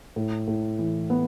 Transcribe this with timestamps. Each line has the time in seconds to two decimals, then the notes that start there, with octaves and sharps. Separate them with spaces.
0.16 A2
0.48 A2
0.79 E3
1.10 B3